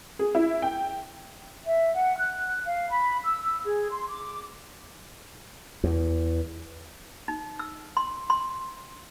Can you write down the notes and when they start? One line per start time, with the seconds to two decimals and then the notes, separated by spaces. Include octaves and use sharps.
0.19 G#4
0.35 E4
0.62 G5
1.65 E5
1.94 F#5
2.16 F#6
2.65 F5
2.89 B5
3.24 E6
3.42 E6
3.64 G#4
3.90 C6
4.07 D6
5.84 E2
7.28 D#4
7.59 E6
7.97 C6
8.30 C6